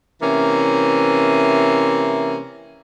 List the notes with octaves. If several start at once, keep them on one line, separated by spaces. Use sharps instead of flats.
C3 E3 A#3 C#4